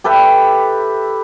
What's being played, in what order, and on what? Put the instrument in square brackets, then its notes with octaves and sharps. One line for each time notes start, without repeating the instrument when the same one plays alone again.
[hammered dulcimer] G4 A4 B4 E5